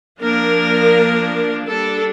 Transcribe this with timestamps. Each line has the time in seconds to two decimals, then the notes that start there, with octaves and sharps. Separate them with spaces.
0.19 F3 A#3 D4 A#4
1.67 G3 D4 A4